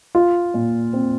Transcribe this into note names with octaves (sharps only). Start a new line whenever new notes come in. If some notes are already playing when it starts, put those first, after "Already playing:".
F4
A#2
C4